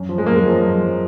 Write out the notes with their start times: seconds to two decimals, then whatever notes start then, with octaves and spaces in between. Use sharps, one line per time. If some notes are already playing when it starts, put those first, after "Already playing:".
Already playing: F#2
0.09 F3
0.18 G#3
0.26 F#2 A#3
0.35 G#3
0.46 F3
0.64 F#2
0.81 F3